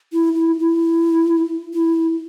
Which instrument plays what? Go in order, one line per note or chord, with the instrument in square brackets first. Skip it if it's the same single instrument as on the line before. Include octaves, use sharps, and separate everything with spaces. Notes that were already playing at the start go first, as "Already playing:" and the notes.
[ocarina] E4
E4
E4
E4